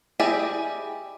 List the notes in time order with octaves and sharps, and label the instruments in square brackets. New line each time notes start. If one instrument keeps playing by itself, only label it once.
[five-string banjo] E4 G4 G#4 D5 D#5